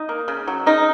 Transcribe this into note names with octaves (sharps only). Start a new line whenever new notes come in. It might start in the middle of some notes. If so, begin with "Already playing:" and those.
Already playing: D#4
A#3
C#3
F#3
C#3 D#4